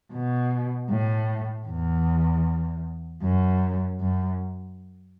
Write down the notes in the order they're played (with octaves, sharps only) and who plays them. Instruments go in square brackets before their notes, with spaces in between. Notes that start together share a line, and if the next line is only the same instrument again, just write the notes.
[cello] B2
A2
E2
F#2
F#2